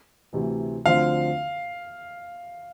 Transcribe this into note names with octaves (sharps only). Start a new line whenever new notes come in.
D2 C3 E3
D2 D3 F3 C4 F5